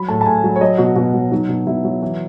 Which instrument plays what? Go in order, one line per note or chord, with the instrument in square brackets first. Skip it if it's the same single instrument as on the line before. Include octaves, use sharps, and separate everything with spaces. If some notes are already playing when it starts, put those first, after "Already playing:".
Already playing: [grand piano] F#3 B5
A2 A5
A5
A2 G#5
F#3
C#5
F#3 D#5
B2 F#4
B2 F#4
F#3
F#3 D#4
B2
B2 E4
F#3
E3